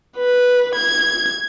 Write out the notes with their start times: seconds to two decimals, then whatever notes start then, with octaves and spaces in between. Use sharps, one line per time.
0.17 B4
0.75 G#6